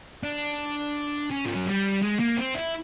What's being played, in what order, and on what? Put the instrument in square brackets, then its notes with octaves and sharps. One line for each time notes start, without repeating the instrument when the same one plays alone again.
[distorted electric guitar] D4
C#4
F3
F#3
G3
G#3
A#3
C4
E4